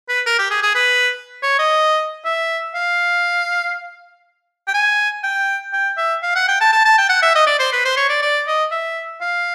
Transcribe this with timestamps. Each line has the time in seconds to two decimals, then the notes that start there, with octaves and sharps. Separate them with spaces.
0.08 B4
0.26 A#4
0.38 G4
0.50 G#4
0.62 G#4
0.75 B4
1.42 C#5
1.59 D#5
2.25 E5
2.74 F5
4.67 G5
4.74 G#5
5.23 G5
5.73 G5
5.97 E5
6.23 F5
6.35 F#5
6.48 G5
6.60 A5
6.72 A5
6.85 A5
6.98 G5
7.09 F#5
7.22 E5
7.35 D#5
7.47 D5
7.59 C5
7.72 B4
7.85 C5
7.97 C#5
8.09 D5
8.22 D5
8.47 D#5
8.71 E5
9.21 F5